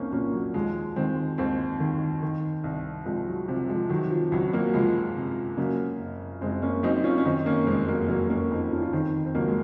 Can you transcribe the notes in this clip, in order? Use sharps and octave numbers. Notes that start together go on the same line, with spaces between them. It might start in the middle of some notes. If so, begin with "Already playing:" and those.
Already playing: C2 A#3 C4 C#4 D#4
A#2 A#3 C#4
F#3
D#2 F3 G#3
D#3 G#3 C4
D#2 G#3 C4
D#3
D#3
C2
C2 F3 G#3
F#3
C3 F3
F3 G#3
D#3 F#3
F#3
F3
C#2 F#3
F#3 A#3
C#2 F3 G#3
C3
C#3 F#3 A#3
F#1
F#1 G#3 C4
A#3 C#4
F#2 C4 D#4
C#4 F4
C#4
D#3 C4 D#4
A#3 C#4
F1 G#3 C4
F#3 A#3
F1 F#3 A#3
A#3 C#4
F2 C4 D#4
C#4 F4
F4
D#3 C4 D#4
C4
C#2 F#3 A#3
G#3